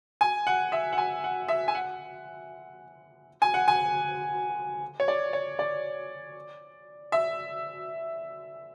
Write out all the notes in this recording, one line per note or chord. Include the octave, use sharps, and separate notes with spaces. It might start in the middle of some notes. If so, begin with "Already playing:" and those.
G#5
F#5
E5
F#5
G#5
F#5
E5
G#5
F#5
G#5
F#5
G#5
C#5
D5
C#5
D5
E5